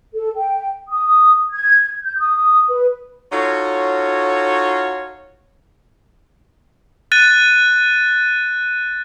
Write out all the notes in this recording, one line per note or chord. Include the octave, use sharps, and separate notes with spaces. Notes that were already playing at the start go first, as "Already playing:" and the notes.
A4
G5
D#6
G#6
G6
D#6
B4
D#4 F4 F#4 A4 C#5
F#6 A6 D#7